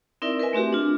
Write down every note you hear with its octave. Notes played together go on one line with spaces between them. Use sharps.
C4 D#4 E4 A#4 D5 E5
A#4 B4 D#5 E5 G#5
A3 C4 F#4 G4
D4 F4